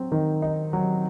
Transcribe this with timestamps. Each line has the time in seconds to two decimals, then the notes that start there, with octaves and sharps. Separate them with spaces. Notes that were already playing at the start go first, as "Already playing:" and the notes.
Already playing: F#3 C4
0.12 D#3
0.42 D#4
0.73 F#3